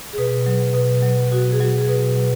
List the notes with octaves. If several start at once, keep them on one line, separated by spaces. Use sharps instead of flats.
G#4
B2 B4
F#3
B2 B4
F#3
B2 F#4
G#4
F#3 F#4
G#4
B2 B4
F#3